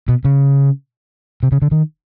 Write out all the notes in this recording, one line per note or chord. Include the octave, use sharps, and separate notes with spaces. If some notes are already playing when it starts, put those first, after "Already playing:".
B2
C#3
C3
C#3
D3
D#3